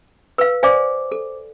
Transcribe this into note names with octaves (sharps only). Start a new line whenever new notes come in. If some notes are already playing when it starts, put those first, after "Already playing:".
B4 F5 E6
C5 D5 F5 G#5 D6
A4